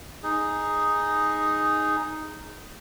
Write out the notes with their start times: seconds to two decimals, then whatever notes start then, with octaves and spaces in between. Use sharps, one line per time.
0.23 D#4 G#4